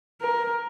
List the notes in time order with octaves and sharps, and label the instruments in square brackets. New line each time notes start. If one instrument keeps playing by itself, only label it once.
[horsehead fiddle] A#4